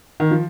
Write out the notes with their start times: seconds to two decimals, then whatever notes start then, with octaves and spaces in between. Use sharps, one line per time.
0.20 D#3
0.31 F3